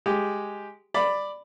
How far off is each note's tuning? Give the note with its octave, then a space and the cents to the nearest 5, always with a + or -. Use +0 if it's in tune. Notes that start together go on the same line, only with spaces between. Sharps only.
G#3 +0 G4 +0
D5 +5 B5 +5